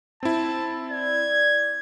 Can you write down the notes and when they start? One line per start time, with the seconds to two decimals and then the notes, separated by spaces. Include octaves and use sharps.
0.23 C4 E4 A5
0.90 D5 G#6